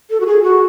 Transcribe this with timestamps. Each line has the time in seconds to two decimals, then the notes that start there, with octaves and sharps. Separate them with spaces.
0.10 A4
0.20 F#4
0.27 G#4
0.44 F#4